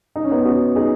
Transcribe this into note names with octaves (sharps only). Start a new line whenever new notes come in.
D#4
C#4
B3 D#4
C#4 F#4
D#4 G#4